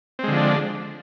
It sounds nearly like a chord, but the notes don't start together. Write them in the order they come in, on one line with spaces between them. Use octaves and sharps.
C4 G#3 D3 F3 D4